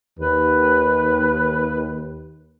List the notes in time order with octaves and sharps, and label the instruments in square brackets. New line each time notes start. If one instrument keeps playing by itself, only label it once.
[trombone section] D#2 [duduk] B4